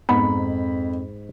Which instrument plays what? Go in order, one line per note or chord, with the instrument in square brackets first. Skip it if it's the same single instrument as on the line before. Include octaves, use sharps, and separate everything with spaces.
[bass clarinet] F2 [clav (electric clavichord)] G#2 D#4 [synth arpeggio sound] B3 [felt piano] B5